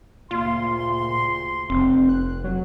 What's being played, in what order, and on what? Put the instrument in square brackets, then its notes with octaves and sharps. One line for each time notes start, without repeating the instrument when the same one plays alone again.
[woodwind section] D2 C#3 C6 [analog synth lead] A#2 [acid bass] F4
[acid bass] F1 [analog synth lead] C4
[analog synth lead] F#6
F#3